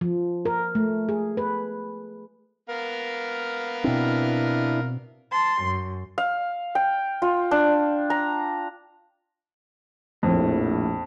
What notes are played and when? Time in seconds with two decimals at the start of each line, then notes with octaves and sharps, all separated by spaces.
0.01 F3
0.45 A#4
0.75 A3
1.09 G#4
1.37 B4
2.69 B3 A#4 F5
3.84 B2 C4 D4 E4
5.31 A5 C6
5.64 F#2
6.18 F5
6.75 G5
7.22 F4
7.51 D4
8.10 A#5
10.23 A#1 F2 A2